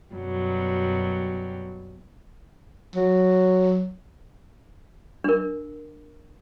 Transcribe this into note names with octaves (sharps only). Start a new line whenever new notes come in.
F#2 B2 F#3 G3
F#3
D4 A#4